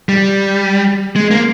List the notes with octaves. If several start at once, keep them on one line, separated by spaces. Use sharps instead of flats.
G3
G#3
A#3